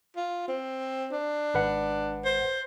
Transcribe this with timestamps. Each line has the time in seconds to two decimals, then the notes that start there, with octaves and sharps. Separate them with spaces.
0.17 F4
0.48 C4
1.12 D4
1.54 G#1 B4 F#5
2.25 C5